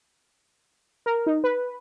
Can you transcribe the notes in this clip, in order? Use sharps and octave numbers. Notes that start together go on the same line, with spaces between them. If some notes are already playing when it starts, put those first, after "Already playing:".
A#4
D#4
B4